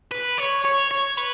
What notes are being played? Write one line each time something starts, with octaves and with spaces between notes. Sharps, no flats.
B4
C#5
C#5
C#5
B4